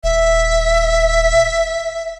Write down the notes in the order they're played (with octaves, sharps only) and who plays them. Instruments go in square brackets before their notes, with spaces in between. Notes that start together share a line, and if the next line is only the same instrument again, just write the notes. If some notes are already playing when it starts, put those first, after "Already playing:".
[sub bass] D#1 [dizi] E5